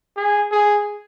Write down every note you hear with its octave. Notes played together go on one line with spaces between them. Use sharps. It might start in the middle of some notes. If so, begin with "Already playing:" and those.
G#4
G#4